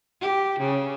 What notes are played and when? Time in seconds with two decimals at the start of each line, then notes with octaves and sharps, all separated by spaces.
0.21 G4
0.60 C#3